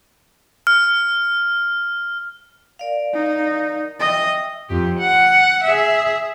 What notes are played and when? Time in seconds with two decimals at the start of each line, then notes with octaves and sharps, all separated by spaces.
0.67 F6
2.79 A#4 D5 F5
3.13 D#4
4.00 D#5 E5 G5 E6
4.69 F2 G4
4.99 F#5
5.63 G#4 E5